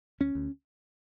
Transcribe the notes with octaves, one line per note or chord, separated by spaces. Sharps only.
D2 C#4
D2